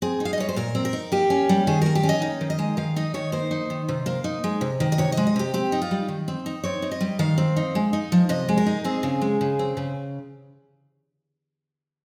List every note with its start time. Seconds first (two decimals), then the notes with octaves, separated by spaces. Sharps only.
0.02 C4 G#4
0.20 D#4
0.25 F5
0.33 D#5
0.38 G3 C#5
0.49 C5
0.56 A#2 A#4
0.75 C4
0.85 A#4
0.93 D#4
1.12 A#3 G4
1.30 C#4
1.49 G3
1.67 D#3 G#4
1.82 A#3 A#4
1.95 G4
2.03 C#4
2.09 D#5
2.22 D#4
2.41 D#3
2.50 D#5
2.59 G#3
2.77 D#3 F5
2.96 D#4 D#5
3.14 D#3 C#5
3.32 A#3 C5
3.51 D#4
3.70 D#3
3.89 C3
4.06 A#3
4.24 D#4
4.44 G#3
4.61 C3
4.80 D#3
4.92 D#5
4.98 C3 C#5
5.12 D#5
5.17 G#3
5.27 D#5
5.36 C3 G4
5.54 C4 G4
5.72 D#4
5.82 F4
5.91 G3
6.08 D#3
6.28 C4
6.46 D#4
6.64 C4 C#5
6.82 D#4
6.91 D#5
7.01 G3
7.19 D#3 F5
7.38 C4
7.56 D#4
7.75 G#3
7.93 D#4
8.12 F3
8.29 C3 D#5
8.49 G#3
8.57 A#4
8.66 D#4
8.84 C4 G#4
9.03 C#3
9.21 G#3
9.41 C#3
9.59 C4
9.77 C#3